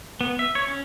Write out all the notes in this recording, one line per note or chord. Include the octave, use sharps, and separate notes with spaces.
B3
E5
C#5
C#4